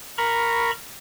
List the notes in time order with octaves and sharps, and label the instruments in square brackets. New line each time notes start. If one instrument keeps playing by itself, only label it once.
[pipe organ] A#4 A#5 B5 C#6